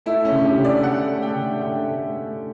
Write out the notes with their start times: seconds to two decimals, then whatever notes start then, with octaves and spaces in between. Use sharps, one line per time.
0.06 A3 E4
0.25 C#4
0.32 D3
0.44 G4
0.57 D3
0.64 D5
0.83 A3 F#5
1.10 A3
1.22 G5
1.36 D3
1.61 D3 G5
1.87 A3
2.13 A3